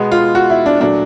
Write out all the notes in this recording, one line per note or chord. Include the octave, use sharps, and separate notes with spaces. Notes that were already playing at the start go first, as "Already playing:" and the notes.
Already playing: B2 G#3 B3
F4
F#4
E4
D4
A#2 F#3 A3 D4